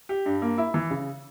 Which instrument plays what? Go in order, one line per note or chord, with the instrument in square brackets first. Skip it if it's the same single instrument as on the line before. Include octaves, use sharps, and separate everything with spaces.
[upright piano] G4
G2
A#3
E4
E3
C#3